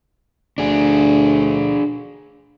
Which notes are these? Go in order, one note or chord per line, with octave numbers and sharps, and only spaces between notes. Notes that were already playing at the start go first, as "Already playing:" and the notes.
D2 D4 G#4